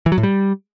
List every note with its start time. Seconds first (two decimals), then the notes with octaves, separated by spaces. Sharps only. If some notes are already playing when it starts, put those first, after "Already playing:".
0.06 E3
0.12 F#3
0.18 A2
0.23 G3